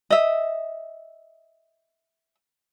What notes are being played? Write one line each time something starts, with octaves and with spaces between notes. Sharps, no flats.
D#5 E5